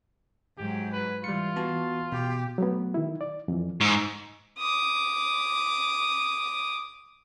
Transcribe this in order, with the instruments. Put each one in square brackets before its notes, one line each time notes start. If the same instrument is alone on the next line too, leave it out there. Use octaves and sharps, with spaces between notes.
[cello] G#2 F#3 [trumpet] G4
[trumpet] B4
[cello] E3 [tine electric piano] G3 C#7 [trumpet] F4
[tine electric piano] B3 F#4 A5
[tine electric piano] B2 [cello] G4
[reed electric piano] F#3 A3 B3
D#3 E4
D5
F2 E3
[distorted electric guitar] G#2 [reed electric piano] C#6 E6
[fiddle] D6 D#6